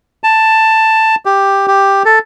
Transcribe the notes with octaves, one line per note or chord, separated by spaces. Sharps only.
A5
G4
G4
A4